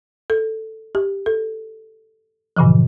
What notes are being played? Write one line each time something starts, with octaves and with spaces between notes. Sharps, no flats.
A4
G4
A4
G2 A#2 C#3 E3 F3